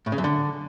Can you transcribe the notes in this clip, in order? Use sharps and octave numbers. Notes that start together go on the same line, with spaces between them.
A2
C#3
F#2
D3